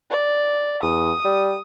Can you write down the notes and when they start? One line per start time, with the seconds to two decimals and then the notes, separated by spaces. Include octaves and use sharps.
0.11 D5
0.83 E2 D#6
1.25 G3